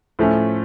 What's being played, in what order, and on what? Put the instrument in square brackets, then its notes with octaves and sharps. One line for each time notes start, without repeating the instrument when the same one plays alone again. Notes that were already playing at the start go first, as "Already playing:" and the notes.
[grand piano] A2 F3 A3 C#4